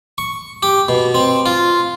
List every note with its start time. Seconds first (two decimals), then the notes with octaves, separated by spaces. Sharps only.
0.18 C#6
0.63 G4
0.89 B2
1.15 C4
1.46 F4